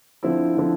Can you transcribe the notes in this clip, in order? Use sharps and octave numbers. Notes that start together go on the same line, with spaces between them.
D3 F3 C4 E4
D3 F3 C4 E4